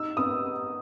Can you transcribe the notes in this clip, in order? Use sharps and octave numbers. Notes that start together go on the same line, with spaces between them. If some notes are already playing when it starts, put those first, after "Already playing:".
Already playing: D#4 E6
B3 D#6